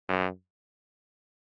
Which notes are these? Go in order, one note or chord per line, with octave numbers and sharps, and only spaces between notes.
F#2